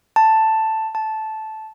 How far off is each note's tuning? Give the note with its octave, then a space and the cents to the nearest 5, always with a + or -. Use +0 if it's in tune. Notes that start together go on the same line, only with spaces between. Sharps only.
A5 +5
A5 -10